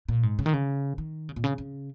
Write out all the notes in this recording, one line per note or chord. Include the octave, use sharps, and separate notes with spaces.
A#2
G#2
C#3
D#3
C#3
D#3
C#3
A#2
C#3
C#3